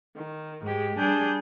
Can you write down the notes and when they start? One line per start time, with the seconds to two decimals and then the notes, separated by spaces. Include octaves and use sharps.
0.16 D#3
0.62 G#2 G#3 G4
0.98 G3 D4 G#4 G6